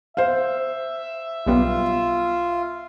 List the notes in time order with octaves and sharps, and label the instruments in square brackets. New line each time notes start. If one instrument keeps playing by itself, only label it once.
[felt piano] C5 F5 [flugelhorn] E5
[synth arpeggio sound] B1 G3 B3 [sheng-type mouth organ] F4